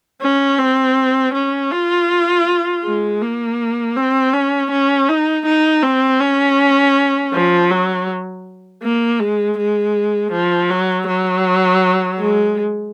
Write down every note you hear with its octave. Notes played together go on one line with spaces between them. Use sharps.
C#4
C4
C#4
F4
G#3
A#3
C4
C#4
C#4
D#4
D#4
C4
C#4
F3
F#3
A#3
G#3
G#3
F3
F#3
F#3
G#3